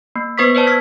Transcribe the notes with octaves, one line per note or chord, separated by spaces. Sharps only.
A#3
B3 B4 C5 C#6 D#6 B6
B4 C5 D5 A5
E6 F6 G#6 B6